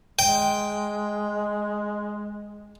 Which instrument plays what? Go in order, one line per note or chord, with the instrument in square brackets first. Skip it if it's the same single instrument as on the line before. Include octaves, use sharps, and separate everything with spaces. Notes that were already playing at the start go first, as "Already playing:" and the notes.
[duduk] G#3 [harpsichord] G5